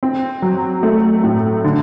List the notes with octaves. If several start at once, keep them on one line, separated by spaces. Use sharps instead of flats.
C4
F#3
A3
A2
D3